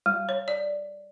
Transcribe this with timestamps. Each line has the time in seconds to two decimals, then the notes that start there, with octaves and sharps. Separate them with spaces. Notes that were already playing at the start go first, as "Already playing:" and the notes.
0.06 G3
0.29 C#5
0.48 D5